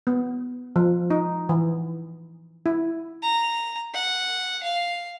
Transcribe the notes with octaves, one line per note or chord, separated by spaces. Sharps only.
B3
F3
D#4
E3
E4
A#5
F#5
F5